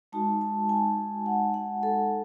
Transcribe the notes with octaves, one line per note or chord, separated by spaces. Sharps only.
G#3 D#4 F#4 A5
A5
G#5
F#5
F#5
A4